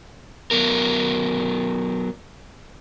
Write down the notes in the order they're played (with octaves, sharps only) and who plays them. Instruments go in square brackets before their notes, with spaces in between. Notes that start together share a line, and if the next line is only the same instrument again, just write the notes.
[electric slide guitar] F#3 B3 A#4